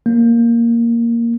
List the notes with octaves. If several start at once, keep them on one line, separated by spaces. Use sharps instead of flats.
A#3